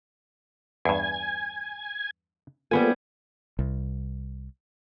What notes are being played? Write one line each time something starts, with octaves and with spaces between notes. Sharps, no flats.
E2 G2 G#5 G#6
G3 A#3 B3 F4 A4 G#5
C2